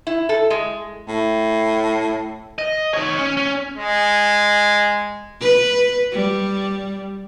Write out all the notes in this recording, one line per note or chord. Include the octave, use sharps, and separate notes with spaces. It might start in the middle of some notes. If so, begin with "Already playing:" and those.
E4
A4
G#3
A2
D#5
D#3 C#5
C#4
C#4
G#3
B4
G3